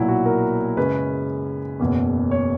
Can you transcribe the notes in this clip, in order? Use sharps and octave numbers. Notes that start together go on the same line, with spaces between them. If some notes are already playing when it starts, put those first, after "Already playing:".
Already playing: B1 A#2 F#3 E4
F#4
A#4
F#2 C#3 G#3 C#4 B4
F#1 E2 B2
C#5